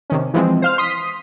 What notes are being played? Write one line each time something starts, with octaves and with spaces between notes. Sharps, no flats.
C3 D#3 C#4
E3 F3 G#3 C4
C5 F5 F6
C6 D#6 B6